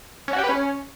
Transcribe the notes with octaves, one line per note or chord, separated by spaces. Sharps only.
C#4
F#4
G4
B4
C#4